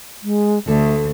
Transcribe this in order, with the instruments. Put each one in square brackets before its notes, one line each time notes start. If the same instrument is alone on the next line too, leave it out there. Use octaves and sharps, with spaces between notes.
[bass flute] G#3
[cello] D2 [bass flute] A3 [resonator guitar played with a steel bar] A4